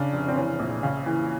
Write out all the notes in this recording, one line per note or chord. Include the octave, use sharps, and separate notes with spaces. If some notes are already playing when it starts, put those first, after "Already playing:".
Already playing: C#3 D4
F1
C4
E3 C#4
A#1
C#3
E3